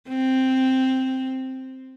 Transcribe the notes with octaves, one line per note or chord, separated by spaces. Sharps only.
C4